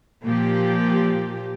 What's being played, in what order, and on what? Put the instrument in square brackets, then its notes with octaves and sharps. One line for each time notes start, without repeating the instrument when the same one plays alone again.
[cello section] A#2 F3 G4